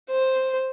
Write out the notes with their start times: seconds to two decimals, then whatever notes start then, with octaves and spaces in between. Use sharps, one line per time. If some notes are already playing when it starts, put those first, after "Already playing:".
0.11 C5